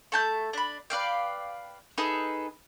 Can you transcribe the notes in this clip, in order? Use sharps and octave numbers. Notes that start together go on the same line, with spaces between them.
A3 A5 G6
D4 B5
B4 D5 F5 G5
D#4 G#4 A4 B4